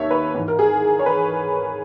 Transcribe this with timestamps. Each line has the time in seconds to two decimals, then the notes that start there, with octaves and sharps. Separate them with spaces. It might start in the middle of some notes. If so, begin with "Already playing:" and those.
Already playing: D#2 D#3 C#5 E5
0.11 B4
0.35 G#2 E3
0.48 A#4
0.59 G#4
0.99 C#5
1.06 B4